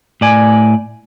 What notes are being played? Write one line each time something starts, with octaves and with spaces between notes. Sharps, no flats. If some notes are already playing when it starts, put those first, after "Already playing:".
A2 D5 G#5